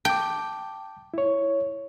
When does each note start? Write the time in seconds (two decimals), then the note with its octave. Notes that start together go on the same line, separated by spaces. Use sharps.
0.05 G5 A5 D6
1.14 E4 C#5